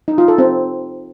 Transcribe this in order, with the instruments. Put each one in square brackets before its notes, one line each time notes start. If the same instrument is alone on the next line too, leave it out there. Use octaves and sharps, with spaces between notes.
[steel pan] D#4
F4
A4
C4